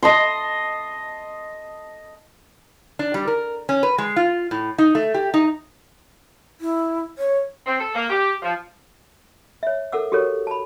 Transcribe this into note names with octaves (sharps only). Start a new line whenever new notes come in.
D#5 A5 C6
D4
G3
A#4
C#4
B4
G#3
F4
A2
D#4
A3
G4
D#4
E4
C#5
C4
A4
A#3
G4
F3
C#5 E5
A4 A#4 F#5 D6 E6
F#4 G4 A4 A#4 C#5
A5 B5